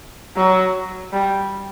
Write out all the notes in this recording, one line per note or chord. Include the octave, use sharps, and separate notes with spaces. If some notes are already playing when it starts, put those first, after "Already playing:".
F#3
G3